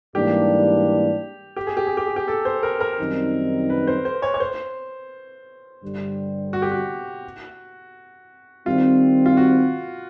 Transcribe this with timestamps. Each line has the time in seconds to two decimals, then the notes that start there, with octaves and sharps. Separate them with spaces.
0.15 G#2 E3 G3 A#3 D4 G4
1.56 G4
1.67 G#4
1.77 G4
1.87 G#4
1.97 G4
2.07 G#4
2.16 G4
2.28 A4
2.45 C5
2.63 A#4
2.80 A#4
2.98 F#2 D#3 G3 C4 D#4
3.70 B4
3.87 C5
4.05 C5
4.22 C#5
4.34 C#5
4.40 C5
5.82 G2 D3 G3
6.53 F#4
6.62 G4
6.72 F#4
8.66 D#3 G3 C4 F4
9.26 F4
9.37 F#4